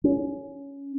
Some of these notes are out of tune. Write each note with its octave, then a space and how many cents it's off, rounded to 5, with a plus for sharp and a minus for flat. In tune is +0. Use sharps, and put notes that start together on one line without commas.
C#4 +15